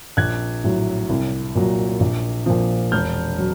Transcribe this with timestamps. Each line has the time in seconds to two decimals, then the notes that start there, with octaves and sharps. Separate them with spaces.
0.17 A#1 F#6 G#6
0.64 A2 F#3
1.09 C2
1.55 A#2 F#3
2.00 A#1
2.46 A#2 F3
2.92 E1 F6 G6
3.38 F#3